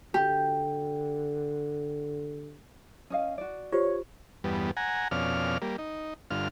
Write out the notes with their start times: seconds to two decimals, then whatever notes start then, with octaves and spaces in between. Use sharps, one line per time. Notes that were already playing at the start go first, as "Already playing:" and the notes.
0.14 D3 G4
3.10 C#4 D#5 F5
3.38 F#4 D5
3.72 F4 G4 C5 C#5
4.44 E2 G2 G3 B3
4.77 F#5 G#5 A#5
5.11 F2 B2 C#4 D5 F5 F6
5.62 G3 A#3
5.78 D#4
6.31 G2 D3 F4 F6